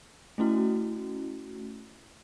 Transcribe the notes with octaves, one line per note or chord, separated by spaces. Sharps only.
A3 C#4 E4 F#4